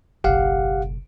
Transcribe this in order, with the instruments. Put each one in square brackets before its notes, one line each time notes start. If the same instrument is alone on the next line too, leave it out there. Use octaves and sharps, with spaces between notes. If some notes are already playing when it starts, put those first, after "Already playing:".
[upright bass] F#1 B1 [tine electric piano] G4 F5 F#5